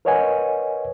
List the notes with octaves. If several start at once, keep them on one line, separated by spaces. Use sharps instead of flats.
A#4 B4 C#5 D#5 F#5 G#5